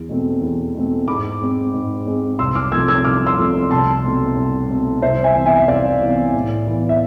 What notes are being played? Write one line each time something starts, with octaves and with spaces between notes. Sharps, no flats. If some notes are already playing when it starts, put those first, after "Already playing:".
Already playing: E2
B2 A3 C4
E2
B2 A3 C4
G#2 B5 D6
G#3 C4
G#2
G#3 C4
C2 C6 E6
D6 F6
C3 F3 A3 E6 G#6
E6 G#6
C2 D6 F6
C6 E6
C3 F3 A3
C2 A5 C6
B2 A3 C4
C2
B2 A3 C4
C2 C5 E5
E5 G#5
C3 E3 B3
E5 G#5
E5
C2 D5 F5
C3 E3 B3
A2
E3 B3
E5